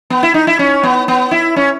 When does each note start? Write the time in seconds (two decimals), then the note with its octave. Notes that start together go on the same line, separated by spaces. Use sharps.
0.10 B3
0.23 E4
0.34 D#4
0.47 E4
0.59 C#4
0.83 B3
1.08 B3
1.31 E4
1.56 C#4